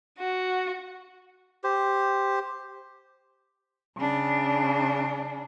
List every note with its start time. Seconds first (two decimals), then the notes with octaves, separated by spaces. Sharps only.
0.19 F#4
1.64 G4 C5
3.97 C#3 D4